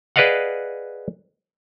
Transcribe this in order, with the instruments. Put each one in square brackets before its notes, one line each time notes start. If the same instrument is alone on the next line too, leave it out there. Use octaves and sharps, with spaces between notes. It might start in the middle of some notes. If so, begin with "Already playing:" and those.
[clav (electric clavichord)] G#4 B4 D5 D#5 F5 F#5